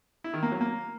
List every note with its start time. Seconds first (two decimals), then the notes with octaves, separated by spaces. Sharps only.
0.24 E4
0.33 D#3
0.43 A#3
0.52 F#3
0.61 A#3